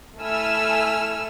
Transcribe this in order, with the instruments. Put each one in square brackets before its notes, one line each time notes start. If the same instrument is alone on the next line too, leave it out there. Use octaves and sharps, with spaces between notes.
[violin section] A3 E4 A4 G#5 E6 F6